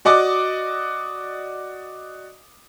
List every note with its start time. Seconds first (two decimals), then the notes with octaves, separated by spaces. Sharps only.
0.05 F#4 D5 D#5 D6